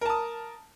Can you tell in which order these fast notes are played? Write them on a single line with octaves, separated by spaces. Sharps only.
A#4 A5 D#6